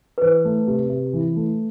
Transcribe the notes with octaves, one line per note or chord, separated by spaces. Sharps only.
B4
E3 C5
A3
C3
C3
E3
A3